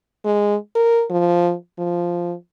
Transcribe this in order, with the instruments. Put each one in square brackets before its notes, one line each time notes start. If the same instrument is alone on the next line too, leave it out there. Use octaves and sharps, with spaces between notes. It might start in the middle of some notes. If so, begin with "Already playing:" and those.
[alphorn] G#3
A#4
F3
F3